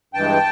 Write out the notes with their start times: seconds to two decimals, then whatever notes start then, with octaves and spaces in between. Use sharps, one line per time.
0.14 G2 E3 G#3 G5 A5